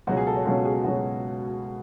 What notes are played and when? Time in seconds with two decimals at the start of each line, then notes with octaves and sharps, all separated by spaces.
0.07 C#2 B2 F#3 C#4 F#4
0.17 G#4
0.27 A4
0.37 C#5
0.46 C#2 B2 F#3 C#4 A4
0.65 G#4
0.84 C#2 B2 F#3 C#4 F#4